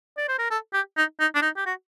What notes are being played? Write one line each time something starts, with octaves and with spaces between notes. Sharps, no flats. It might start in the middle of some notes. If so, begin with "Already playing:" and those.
D5
C5
A#4
A4
G4
D#4
D#4
D4
D#4
G4
F#4